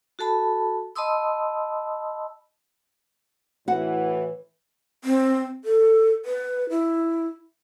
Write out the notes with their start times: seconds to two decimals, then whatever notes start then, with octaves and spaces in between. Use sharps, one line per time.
0.19 F#4 A4 A5 B5
0.95 D#5 A5 B5 C6 D#6 E6
3.68 A2 E3 F#4 F#5
5.04 C4
5.64 A4
6.25 B4
6.70 E4